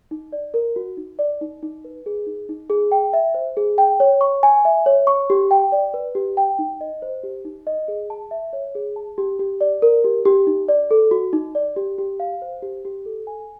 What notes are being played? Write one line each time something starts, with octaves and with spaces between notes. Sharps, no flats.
D#4
D5
A#4
F#4
D#4
D5
D#4
D#4
B4
G#4
D#4
D#4
G#4
G5
E5
C5
G#4
G5
C#5
C#6
G#5
E5
C#5
C#6
G4
G5
D5
B4
G4
G5
D#4
D#5
C5
G4
D#4
D#5
G#4
A5
E5
C#5
G#4
A5
G4
G4
D5
A#4
G4
G4
D#4
D5
A4
F#4
D#4
D5
G4
G4
F5
C5
G4
G4
A4
G#5